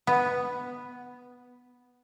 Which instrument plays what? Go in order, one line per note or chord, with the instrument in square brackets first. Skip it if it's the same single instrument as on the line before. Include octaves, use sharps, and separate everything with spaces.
[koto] B3